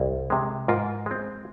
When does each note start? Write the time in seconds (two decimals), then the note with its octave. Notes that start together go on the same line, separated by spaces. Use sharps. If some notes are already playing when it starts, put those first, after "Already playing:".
Already playing: C2
0.30 C3 G#3
0.68 G#2 F4 A#4
1.06 G#3 C4